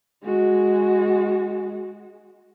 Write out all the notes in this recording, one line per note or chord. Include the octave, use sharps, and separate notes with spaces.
G#3 F#4